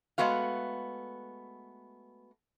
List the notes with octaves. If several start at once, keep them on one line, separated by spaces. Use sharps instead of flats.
G#3 A3 B3 F#4 F5